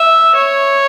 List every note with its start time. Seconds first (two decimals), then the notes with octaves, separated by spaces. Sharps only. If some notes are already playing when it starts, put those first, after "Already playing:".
Already playing: E5
0.35 C#5